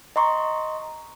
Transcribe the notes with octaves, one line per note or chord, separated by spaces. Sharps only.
D#5 A#5 C6 C#6